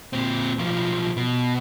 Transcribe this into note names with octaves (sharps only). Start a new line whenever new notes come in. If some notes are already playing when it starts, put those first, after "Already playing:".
A#2 C4
B1 F3
B2